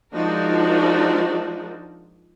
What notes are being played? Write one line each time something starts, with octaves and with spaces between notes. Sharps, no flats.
F3 G#3 D4 D#4 F#4 A#4